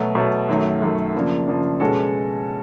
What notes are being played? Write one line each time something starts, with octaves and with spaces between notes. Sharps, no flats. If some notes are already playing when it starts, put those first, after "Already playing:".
Already playing: B2 F#3 A3
B2 F#3 A3
F#2 D#3 F#3 A3
F#2 D#3 F#3 A3
C#3 F3 A#3 D4
C#3 F3 A#3 D4
B2 G#3 C#4 F#4 A4